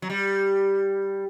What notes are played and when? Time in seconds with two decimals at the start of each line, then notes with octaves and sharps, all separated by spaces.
0.02 F#3
0.10 G3